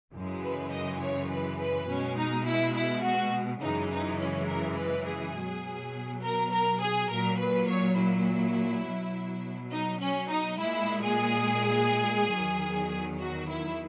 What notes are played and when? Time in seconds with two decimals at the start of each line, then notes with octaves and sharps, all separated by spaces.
0.12 F#2 C#3 E3 G#3
0.42 B4
0.71 D#5
1.00 C#5
1.29 B4
1.59 B4
1.87 B2 G#3 C#4
2.17 D#4
2.45 E4
2.74 E4
3.03 F#4
3.61 F#2 C#3 E3 G#3 D#4
3.91 D#4
4.19 C#4
4.48 A#4
4.78 B4
5.07 G#4
5.36 B2 F#3
6.23 A#4
6.51 A#4
6.81 G#4
7.10 A#2 F#3 A#4
7.39 B4
7.69 C#5
7.98 E4
8.85 B2 F#3
9.72 D#4
10.00 C#4
10.29 D#4
10.58 A#2 G#3 E4
11.03 G#4
12.33 E2 D#3 F#3
13.20 F#4
13.49 E4